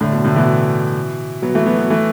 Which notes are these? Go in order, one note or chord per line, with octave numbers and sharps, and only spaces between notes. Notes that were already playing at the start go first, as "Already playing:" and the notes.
A2 D3
B2
A2 D3
B2 E3
F#3 B3
E3 A3
F#3 B3
F#3 B3
E3 A3